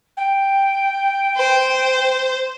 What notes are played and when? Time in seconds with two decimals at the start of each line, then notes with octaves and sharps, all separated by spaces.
0.17 G5
1.37 C5